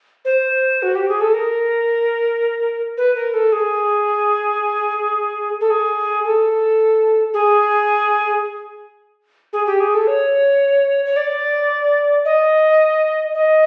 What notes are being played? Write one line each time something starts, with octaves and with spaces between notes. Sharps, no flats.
C5
F#4
G4
G#4
A4
A#4
B4
A#4
A4
G#4
A4
G#4
A4
G#4
G#4
G4
G#4
A4
C#5
C#5
D5
D#5
D#5